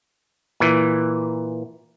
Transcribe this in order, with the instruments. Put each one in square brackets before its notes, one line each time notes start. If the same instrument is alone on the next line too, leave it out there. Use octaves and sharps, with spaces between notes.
[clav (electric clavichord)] A#2 E3